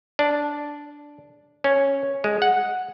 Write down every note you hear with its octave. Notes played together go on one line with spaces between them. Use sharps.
D4
C#4
G#3
F#5